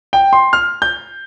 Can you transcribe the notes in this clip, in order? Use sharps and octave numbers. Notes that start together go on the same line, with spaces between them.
G5
C6
F6
G6